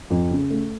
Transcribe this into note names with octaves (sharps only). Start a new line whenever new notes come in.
F2
C#3
A3